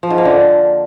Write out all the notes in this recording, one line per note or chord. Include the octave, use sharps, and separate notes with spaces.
F3
G#2
A#3
D3